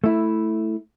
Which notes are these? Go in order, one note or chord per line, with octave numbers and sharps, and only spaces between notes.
A3 E4